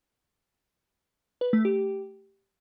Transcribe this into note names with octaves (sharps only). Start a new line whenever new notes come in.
B4
A3
G4